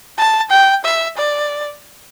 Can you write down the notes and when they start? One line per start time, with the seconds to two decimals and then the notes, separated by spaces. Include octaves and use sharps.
0.18 A5
0.51 G5
0.84 E5
1.17 D5